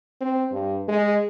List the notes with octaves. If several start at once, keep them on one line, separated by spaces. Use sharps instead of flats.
C4
G2
G#3